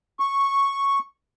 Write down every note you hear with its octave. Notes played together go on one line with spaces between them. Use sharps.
C#6